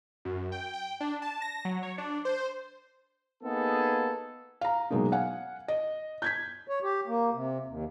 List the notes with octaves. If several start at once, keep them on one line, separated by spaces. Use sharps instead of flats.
F#2
G5
G5
D4
A5
A#6
F#3
C#5
D4
C5
A#3 B3 D#4 G#4 A4
F5 A#5
B2 F#3 G#3 A#3 D#4
F5 F#5 G#5
D#5
G6 G#6 B6
C#5
G4
A#3
C3
D#2